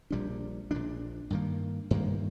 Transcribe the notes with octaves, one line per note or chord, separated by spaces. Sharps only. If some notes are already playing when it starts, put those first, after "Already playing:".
A#1 A#2 G3 D4
A#1 A#2 G3 D4
G2 D#3 A#3
G2 D#3 A#3